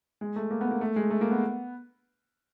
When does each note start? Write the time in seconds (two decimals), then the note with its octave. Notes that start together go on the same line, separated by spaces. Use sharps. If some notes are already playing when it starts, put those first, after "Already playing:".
0.21 G#3
0.36 A3
0.51 A#3
0.61 B3
0.71 A#3
0.81 A3
0.96 G#3
1.10 A3
1.21 A#3
1.31 B3